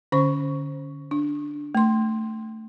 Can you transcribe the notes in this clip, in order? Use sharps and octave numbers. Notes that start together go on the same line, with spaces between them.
D3 C#4 C5 C#6
D4
A3 C6